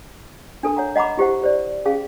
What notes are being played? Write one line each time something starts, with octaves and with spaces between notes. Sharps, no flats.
D4 A4 A#4 A5
C#5 F#5 A#5
D#5 F#5 A#5 B5 D6
E4 G4 C5 F#5
G4 C5 D5
C#4 G#4 F5 A5